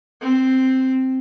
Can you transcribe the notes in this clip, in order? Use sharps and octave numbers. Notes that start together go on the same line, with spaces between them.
C4